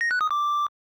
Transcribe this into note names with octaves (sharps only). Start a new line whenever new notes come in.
A#6
F#6
D#6
D6